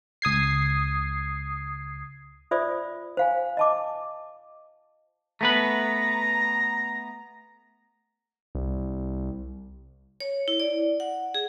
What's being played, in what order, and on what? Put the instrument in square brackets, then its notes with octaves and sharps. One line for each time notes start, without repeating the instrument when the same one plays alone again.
[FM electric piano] C#2 D#6 G#6 C7
[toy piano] F4 C5 D5 E5 D#6
C5 F5 G#5
D#5 A5 D6
[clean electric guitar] A3 B3 B4 [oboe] A#5
[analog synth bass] C2
[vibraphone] C#5
E4
D5
F#5
G#4